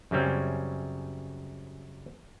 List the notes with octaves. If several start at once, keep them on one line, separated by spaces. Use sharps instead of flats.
F#2 C#3 G3 C4 C#4